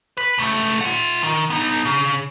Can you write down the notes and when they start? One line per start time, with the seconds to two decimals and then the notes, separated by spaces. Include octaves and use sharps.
0.17 B4
0.38 C#2 A3
0.81 F4 F#5
1.23 D#3
1.50 B3 D#4
1.85 C#3